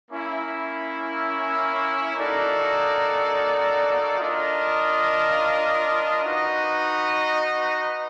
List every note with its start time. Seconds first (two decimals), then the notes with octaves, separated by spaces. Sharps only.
0.11 A#3 C#4 E4
2.16 A#3 D#4 F#4 A4 D5
4.19 D4 F4 A#4 D#5
6.24 D#4 F#4 B4 D#5